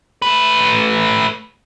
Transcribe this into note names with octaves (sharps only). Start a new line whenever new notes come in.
A3 B4